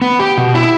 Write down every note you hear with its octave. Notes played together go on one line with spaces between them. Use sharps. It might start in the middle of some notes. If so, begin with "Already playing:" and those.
B3
G4
B2
E4